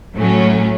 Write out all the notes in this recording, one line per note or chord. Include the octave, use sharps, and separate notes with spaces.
A2 F#3 A3 C#4